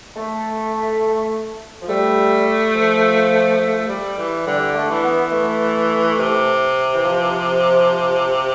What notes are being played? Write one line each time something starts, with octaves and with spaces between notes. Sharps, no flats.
A3
F3
G3 A3
F3
A3
G3
E3
D3 G3
A3
E3
B3
A3
C3
E3
F3